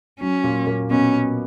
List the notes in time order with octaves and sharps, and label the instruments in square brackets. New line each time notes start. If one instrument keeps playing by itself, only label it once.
[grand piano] F#3 [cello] C#4
[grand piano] A#2 A#3
A#2 A#3
[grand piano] B2 B3 [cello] C#4